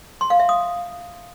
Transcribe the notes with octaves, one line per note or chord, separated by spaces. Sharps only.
C6
F5
E5
D#6